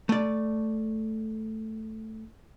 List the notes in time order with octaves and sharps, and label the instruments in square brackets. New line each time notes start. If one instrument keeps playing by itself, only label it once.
[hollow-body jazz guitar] A3 D5